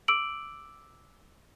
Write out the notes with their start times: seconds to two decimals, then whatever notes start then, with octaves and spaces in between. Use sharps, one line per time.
0.08 D6 E6 D7 F#7